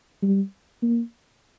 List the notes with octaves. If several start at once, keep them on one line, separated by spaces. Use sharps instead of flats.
G3
A#3